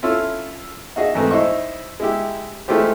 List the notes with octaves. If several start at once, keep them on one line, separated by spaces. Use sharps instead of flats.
C#4 E4 F4 A4
D#4 F#4 G#4 D#5 E5
F2 G#2 E3 A3
D#4 E4 C5 D#5 C#6
G#3 E4 G4
G#3 A3 E4 F4 G4 C5